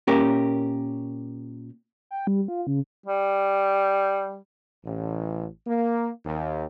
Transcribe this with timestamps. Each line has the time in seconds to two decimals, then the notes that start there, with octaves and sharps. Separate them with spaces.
0.08 A#2 C#4 G4 A#4
2.11 G5
2.27 G3
2.48 F4
2.67 C#3
3.06 G3
4.84 A1
5.66 A#3
6.24 D#2